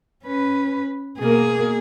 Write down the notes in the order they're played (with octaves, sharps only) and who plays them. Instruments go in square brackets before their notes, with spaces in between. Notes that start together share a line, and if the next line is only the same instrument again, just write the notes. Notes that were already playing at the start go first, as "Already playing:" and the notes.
[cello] C#4 B4
[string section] B2 A#3 [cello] G#4